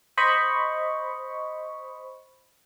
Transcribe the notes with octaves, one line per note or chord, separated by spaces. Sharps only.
C5 D#5 B5 C#6